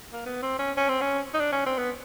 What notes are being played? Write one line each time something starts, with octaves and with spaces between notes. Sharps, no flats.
A#3
B3
C4
C#4
C#4
C4
C#4
D#4
D4
C#4
C4
B3